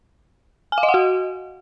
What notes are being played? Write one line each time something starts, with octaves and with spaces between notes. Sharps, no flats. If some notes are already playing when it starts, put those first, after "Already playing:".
G#5
F5
D#5
F#5
F#4